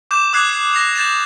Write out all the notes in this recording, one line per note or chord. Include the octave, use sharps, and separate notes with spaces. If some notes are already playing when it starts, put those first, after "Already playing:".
D6 G6 E7
D6 D#6 F#6 G#6 C7
C7
A#6 C7 F7
G6 A6 E7